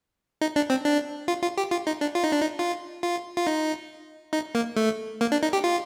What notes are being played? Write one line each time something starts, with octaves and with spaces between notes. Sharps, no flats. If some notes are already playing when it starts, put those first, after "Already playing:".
D#4
D4
C4
D4
F4
F4
G4
F4
D#4
D4
F4
D#4
D4
D#4
F4
F4
F4
D#4
D#4
A#3
A3
A#3
D4
D#4
G4
F4